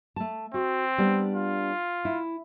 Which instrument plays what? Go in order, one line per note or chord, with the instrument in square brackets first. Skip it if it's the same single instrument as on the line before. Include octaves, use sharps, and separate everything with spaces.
[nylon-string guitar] A3 A5
[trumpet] C4 [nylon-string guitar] F#4
[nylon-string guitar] G3 B3 D4
[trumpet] F4
[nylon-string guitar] E4